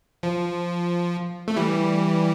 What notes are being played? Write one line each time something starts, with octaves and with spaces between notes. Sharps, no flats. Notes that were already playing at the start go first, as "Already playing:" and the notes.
F3
A3
E3 G3